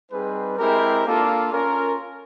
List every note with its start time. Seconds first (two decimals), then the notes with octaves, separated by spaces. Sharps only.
0.10 G3 C4 D#4 G#4 B4
0.57 G#3 C4 E4 G4 A#4
1.04 A#3 D4 F4 A4 D5
1.51 C#4 F4 A#4